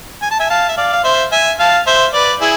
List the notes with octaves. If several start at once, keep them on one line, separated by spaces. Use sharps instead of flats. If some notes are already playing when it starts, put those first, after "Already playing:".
G#5
A5
E5 G#5
F5 A5
E5
D5 F5
F5
C5 E5
E5 G#5
F5 A5
C5 E5
B4 D5
E4 G#4